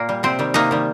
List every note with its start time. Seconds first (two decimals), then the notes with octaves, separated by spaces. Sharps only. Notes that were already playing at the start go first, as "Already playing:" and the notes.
Already playing: A#2 A#3
0.09 G3
0.23 C3 C4
0.39 D#3 G3
0.54 C3 A#3 D#4
0.71 D#3 G3